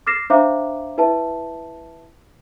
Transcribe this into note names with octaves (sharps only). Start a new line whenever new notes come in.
D6 F6 A6 A#6 C7 E7
D4 C5 E5 F5 A#5 D6
E4 B4 E5 A5